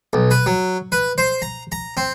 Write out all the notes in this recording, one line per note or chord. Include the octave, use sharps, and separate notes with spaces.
B1
B4
F#3
B4
C5
A#5
A#5
C4